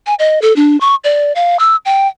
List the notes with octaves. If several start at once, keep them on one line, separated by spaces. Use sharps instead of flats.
G#5
D#5
A4
D4
C#6
D5
F5
E6
G5